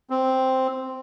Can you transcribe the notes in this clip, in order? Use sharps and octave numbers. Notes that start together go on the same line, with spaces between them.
C4